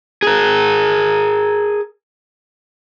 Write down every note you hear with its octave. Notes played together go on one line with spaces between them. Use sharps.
G#4 A#4